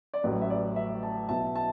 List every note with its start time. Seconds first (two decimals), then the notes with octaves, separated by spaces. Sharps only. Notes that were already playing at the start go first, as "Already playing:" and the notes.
0.14 D5
0.23 A1 A2 F#3 B4
0.41 E5
0.50 D5
0.76 E5
1.03 A5
1.29 B1 B2 B3 E4 A5
1.55 A5